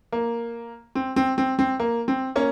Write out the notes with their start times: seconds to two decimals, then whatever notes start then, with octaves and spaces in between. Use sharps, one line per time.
0.12 A#3
0.95 C4
1.16 C4
1.38 C4
1.59 C4
1.80 A#3
2.08 C4
2.35 A#3 C#4